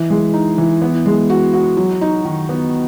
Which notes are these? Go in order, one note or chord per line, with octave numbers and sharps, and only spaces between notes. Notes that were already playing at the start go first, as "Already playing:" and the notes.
Already playing: E3 E4
G#3
D#4
E3
B3
G#3
F#4
F#4
F#3
D#4
D#3
B3